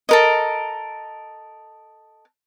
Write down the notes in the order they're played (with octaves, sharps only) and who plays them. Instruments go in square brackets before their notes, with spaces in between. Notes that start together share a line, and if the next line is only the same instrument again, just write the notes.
[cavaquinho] A4 A#4 D#5